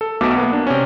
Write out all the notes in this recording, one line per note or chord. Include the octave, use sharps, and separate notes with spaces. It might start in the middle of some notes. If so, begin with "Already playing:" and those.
A4
B1 B2 A3 E5 D6
A#3 B3
D4
C3 C#4